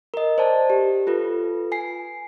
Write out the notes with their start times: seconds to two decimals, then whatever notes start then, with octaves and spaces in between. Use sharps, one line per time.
0.14 A#4 D#5
0.38 C5 D5 A5
0.70 G4
1.07 F4 A4 B4
1.72 G#5 C7